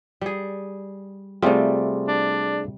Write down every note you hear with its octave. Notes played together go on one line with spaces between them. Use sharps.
G3 G#4
C3 G3 A3 C4 F4 G#4 D5
D4